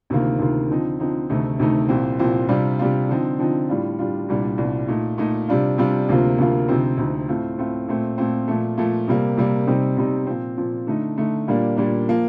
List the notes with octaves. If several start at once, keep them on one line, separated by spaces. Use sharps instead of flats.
D2 C3 D#3 A#3 F4
D2 C3 D#3 A#3 F4
D3 F3 C4 D#4
D3 F3 C4 D#4
D2 C3 D#3 A3 D#4
D2 C3 D#3 A3 D#4
C2 A#2 F3 C4
C2 A#2 F3 C4
C3 G3 D4 F4
C3 G3 D4 F4
D3 F3 C4 D#4
D3 F3 C4 D#4
A2 G3 D4 F4
A2 G3 D4 F4
C2 A#2 G3 D4
C2 A#2 G3 D4
A#2 A3 D#4
A#2 A3 D#4
C3 G3 D4 F4
C3 G3 D4 F4
D2 C3 F3 A#3 F4
D2 C3 F3 A#3 F4
D2 C3 F3 C4 D#4
D2 C3 F3 C4 D#4
A2 A3 C4 F4
A2 A3 C4 F4
A#2 A3 C4
A#2 A3 C4
A#2 F3 A3
A#2 F3 A3
C3 G3 A#3
C3 G3 A#3
C3 G3 C4 D#4
C3 G3 C4 D#4
A#2 F3 C4
A#2 F3 C4
D3 A3 D#4
D3 A3 D#4
A#2 G3 A#3 D4
A#2 G3 A#3 D4
F3 A#3